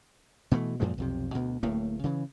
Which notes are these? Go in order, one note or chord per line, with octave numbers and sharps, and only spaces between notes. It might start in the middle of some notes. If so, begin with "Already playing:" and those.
B2 E3 F3 A3
F#2 A#2 F3 G#3
B1 F2 C3
D2 B2
D1 A2 A3 A#3
C#3 E3